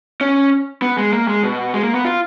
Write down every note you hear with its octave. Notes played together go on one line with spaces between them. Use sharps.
C#4
B3
G#3
A#3
G#3
B2
G#3
A#3
B3
F4